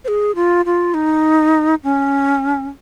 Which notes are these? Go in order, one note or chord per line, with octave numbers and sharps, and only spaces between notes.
C5
G#4
F4
F4
D#4
C#4